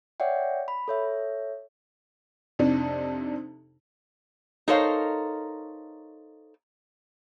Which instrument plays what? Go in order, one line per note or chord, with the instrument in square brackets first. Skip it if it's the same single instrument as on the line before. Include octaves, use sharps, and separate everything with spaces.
[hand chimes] C#5 D5 E5 F#5 G5
B5
A4 C#5 E5
[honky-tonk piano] F2 C3 D4 D#4
[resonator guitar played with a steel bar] D#4 A4 A#4 C5 C#5 F5